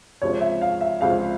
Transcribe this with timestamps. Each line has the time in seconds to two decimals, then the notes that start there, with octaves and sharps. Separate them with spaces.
0.22 C#2 C3 F3 C#5
0.41 E5
0.61 F5
0.81 E5
1.01 C#2 C3 F3 F5